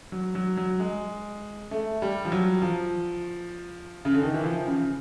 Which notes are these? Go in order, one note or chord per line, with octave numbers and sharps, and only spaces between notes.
F#3
F#3
F#3
G#3
A3
G3
F3
F#3
F3
C#3
D3
D#3
E3
F3
C#3